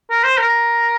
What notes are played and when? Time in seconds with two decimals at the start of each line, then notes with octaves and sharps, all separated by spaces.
0.10 A#4
0.24 C5
0.38 A#4